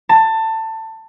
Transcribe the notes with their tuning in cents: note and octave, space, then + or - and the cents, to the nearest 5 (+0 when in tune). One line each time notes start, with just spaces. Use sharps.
A5 +20